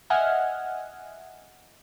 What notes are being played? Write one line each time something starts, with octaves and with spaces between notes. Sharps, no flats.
D#5 E5 F#5 G#5 F6